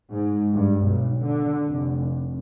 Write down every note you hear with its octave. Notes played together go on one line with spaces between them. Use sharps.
G#2
G2
B1
D3
F1